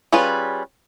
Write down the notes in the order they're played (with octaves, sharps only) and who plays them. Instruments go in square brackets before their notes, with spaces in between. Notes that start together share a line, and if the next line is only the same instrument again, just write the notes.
[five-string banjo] G3 C#4 F4 G#4 B4